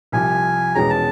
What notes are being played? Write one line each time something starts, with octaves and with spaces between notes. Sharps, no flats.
C2 C3 F3 G#5
E1 E2 B2 G#3 C#4 A#5
A5